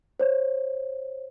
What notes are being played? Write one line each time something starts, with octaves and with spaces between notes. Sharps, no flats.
C5 C#5